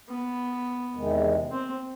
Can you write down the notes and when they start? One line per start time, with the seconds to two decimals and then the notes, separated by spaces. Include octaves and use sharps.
0.09 B3
0.94 E2 C3 D#3 G#3
1.51 C4